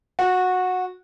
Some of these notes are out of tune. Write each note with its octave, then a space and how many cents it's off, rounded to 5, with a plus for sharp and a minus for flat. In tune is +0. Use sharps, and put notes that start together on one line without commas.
F#4 -15